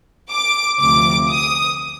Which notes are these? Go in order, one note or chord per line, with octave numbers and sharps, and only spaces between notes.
D6
D2 C3 F3 D6
D#6